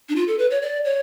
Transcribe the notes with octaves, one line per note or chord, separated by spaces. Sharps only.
D4
F4
A4
B4
C#5
D5
C#5